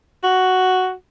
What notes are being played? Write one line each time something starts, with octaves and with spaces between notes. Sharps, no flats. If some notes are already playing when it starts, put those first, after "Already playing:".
F#4